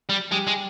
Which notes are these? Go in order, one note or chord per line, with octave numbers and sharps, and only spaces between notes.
G3
G3 G#3 G4
G#3